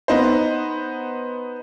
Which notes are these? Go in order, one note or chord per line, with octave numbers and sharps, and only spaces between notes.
B3 D#4 C5